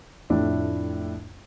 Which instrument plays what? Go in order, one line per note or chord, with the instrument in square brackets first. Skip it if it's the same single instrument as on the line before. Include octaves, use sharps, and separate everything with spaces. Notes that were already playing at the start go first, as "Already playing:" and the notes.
[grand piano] F2 A2 A3 D4 E4